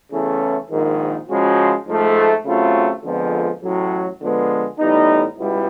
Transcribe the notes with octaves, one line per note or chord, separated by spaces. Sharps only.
E2 C#3 E3 A3 C#4
A#1 G#2 D#3
C#3 F3 G#3 C#4 F#4
G#2 F3 A3
C#3 F#3 A3 C4 F4
F2 D3 F3 G#3 B3
A1 A2 F#3
D3 F3 G#3 B3
A2 E3 G3 B3 D#4
C#2 B2 G3 B3 E4